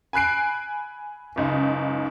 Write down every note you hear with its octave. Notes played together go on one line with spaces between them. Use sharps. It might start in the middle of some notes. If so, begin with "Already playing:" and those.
G#5 B5 F#6 C7 D7
F#1 C#2 D#4